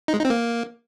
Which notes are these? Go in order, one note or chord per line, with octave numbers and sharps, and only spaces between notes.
D#4
G#3
D#4
C4
A#3